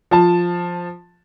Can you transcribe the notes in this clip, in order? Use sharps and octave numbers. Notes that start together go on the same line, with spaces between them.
F3 A5